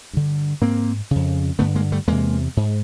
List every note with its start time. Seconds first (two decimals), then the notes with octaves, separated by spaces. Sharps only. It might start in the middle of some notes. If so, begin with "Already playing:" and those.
0.13 G2 D3
0.61 G#2 A#3 C4
1.11 F2 C#3
1.59 G2 D3 A3 B3
1.75 G#3 A#3
1.92 G3 A3
2.07 E2 C3 G#3 A#3
2.57 G#2